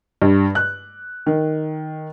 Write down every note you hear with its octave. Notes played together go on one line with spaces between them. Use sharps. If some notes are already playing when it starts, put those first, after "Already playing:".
G2
F#6
D#3